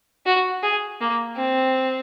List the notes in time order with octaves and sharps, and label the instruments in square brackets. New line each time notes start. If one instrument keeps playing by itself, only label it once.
[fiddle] F#4
G#4
A#3
C4